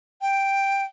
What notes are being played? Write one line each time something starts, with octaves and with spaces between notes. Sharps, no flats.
G5